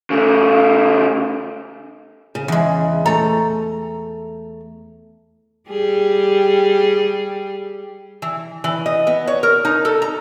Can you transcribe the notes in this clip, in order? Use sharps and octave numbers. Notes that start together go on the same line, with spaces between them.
C#3 A3
C#3
E2 G#3
A3 A4 A#5
G3 G4 G#4
E3
E3
D#5
B3
C#5
A#4
D#4
A4
A#5